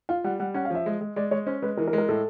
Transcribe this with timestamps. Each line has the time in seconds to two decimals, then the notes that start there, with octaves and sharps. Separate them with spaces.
0.09 F4 F5
0.24 G3 F#5
0.40 G3 F#5
0.54 C#4 F#5
0.65 F5
0.70 F3 E5
0.86 G#3
1.01 G#3
1.16 G#3 D5
1.31 G#3 C#5
1.47 C#4 C5
1.62 G#3 B4
1.77 E3 A#4
1.88 A#4
1.93 G#3
1.98 A#4
2.08 A2 A4